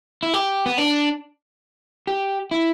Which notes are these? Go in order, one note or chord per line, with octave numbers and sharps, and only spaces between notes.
E4
G4
B3
D4
G4
E4